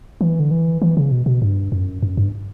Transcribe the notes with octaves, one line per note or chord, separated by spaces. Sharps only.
E3
D3
E3
E3
C#3
B2
B2
G2
F#2
F#2
G2